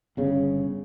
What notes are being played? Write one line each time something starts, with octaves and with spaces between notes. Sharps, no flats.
G1 C#3